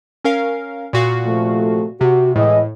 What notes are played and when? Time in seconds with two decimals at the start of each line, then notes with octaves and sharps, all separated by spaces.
0.24 C#4 A#4 F5
0.93 A#2 F#4 F5
1.25 C3 F3 A3
2.01 C3 F#4
2.35 A2 E3 G#3 D#5